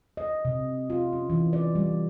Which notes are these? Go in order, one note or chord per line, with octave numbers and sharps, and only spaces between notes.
D#5
C3
F4
C#4
E3
D5
G3